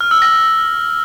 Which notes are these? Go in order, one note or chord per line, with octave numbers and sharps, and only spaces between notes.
F6
E6
A#6